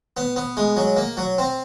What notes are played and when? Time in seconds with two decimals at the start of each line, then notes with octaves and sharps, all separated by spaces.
0.17 B3
0.36 B3
0.57 G#3
0.77 F#3
0.97 A#3
1.17 F#3
1.38 C4